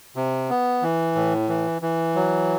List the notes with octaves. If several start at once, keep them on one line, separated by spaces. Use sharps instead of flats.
C3
B3
E3
A2
E3
E3
F#3